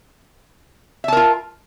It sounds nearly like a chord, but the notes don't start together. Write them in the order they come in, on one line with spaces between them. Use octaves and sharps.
E5 A5 A#4 F4